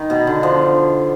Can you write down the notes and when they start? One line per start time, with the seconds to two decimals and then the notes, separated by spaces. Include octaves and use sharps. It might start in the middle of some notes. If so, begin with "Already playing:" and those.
Already playing: D#3
0.10 B2
0.27 D3
0.43 F3